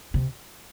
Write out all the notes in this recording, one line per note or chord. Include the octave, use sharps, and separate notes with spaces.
C3